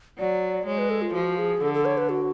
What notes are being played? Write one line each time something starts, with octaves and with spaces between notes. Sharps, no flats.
F#3 D5
G#3 C#5
B4
A4
F4
F3 F#4
G#4
D3 A4
A4
C#5
B4
F#4